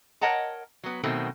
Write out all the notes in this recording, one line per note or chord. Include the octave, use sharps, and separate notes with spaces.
A#4 C#5 D#5 F#5 A5 A#5
F#3 B3
B2 D#3 F#3 A3 C4